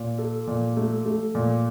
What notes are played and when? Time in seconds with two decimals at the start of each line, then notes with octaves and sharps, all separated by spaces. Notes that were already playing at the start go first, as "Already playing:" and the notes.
Already playing: A#2
0.18 A4
0.47 A#2
0.77 A3
1.05 A3
1.35 A#2